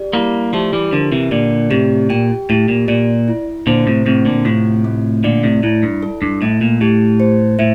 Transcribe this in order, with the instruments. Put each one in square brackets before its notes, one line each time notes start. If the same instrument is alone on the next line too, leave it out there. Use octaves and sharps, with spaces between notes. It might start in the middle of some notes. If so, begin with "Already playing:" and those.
Already playing: [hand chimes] G4 D5
[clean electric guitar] G3 A#3 [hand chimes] E4
[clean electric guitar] F3 A3 [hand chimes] G4
[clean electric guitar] E3 G3
[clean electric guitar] D3 F3 [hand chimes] A#4
[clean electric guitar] C3 E3
[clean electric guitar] A#2 D3 [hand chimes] D5
[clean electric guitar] A2 C3 [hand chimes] G4
[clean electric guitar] A#2 [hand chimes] G5
[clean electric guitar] A2 [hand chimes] G4
[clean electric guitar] A#2
[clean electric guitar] A#2 [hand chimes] D5
[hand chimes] E4
[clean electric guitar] A#2 D3 [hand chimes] C5
[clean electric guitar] A2 C3
[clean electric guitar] A2 C3 [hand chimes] C4
[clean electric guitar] A#2 D3
[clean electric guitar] A2 C3 [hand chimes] F4
[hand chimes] A3
[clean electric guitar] A#2 D3 [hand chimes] D5
[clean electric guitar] A2 C3
[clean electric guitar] A2 [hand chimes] E4
[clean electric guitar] G2
[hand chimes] A4
[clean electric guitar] G2
[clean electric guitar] A2 [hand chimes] A3
[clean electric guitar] A#2
[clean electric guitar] A2 [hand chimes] G4
[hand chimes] C5
[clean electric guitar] A2 [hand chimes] E5